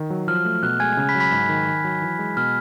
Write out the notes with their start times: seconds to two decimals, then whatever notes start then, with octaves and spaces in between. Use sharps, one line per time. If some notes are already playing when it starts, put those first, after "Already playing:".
Already playing: D#3
0.10 F#3
0.28 F3 F6
0.45 A3
0.63 B2 F#6
0.80 G#3 G#5 G#6
0.97 C#3
1.09 B5 B6
1.15 F#3
1.20 B5 B6
1.32 G#2 B5 B6
1.49 D#3
1.67 D#3
1.85 F#3
2.02 E3
2.19 G#3
2.37 B2 F6